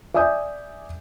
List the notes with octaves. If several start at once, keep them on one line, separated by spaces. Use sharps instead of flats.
D5 E5 G#5 D#6 G6